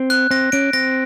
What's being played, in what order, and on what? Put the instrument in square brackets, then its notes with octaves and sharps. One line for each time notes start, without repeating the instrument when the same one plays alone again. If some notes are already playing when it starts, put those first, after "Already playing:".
Already playing: [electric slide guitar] C4
[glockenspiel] F#6
[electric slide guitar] C4 [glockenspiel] A#6
[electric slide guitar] C#4 [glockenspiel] D7
[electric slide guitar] C4 [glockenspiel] A#6